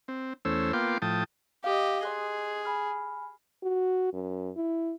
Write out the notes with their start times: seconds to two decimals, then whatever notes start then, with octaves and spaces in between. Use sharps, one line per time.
0.08 C4
0.45 E2 A3 C#4 C5 E6
0.73 A#3 B3 F4 G5 C6 D6
1.02 A2 F3 G5 A5 D#6
1.64 G4 D#5 F5
2.03 G#4 D#5 C6 F#6
2.65 G#5 B5 F6
3.63 F#4
4.13 F#2
4.56 E4